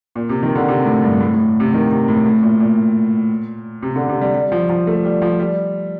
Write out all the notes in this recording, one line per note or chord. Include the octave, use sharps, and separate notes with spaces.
A#2
C3
D#3
D3
C3
A2
G2
A2
A2
C3
D#3
C3
A2
A2
A#2
A#2
C3
D3
C3
G3
G3
F3
F3
A3
G3
F3
G3